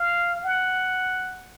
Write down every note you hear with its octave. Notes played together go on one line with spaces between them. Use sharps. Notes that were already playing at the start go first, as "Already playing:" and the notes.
Already playing: F5
F#5